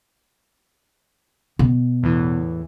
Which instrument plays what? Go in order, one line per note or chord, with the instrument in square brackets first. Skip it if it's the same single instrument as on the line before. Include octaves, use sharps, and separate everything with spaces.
[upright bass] B2
[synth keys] E2 A2 E3